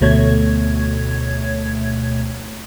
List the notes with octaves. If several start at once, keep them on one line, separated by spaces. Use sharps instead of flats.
D2 B2 A3 C#5 G#6